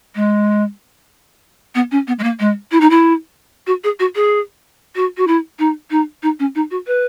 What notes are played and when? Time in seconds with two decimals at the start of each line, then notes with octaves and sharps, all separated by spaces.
0.15 G#3
1.75 B3
1.91 C#4
2.07 B3
2.19 G#3
2.23 A#3
2.39 G#3
2.71 E4
2.81 D#4
2.90 E4
3.67 F#4
3.84 G#4
3.99 F#4
4.15 G#4
4.95 F#4
5.17 F#4
5.27 E4
5.59 D#4
5.91 D#4
6.23 D#4
6.39 C#4
6.55 D#4
6.71 F#4
6.87 B4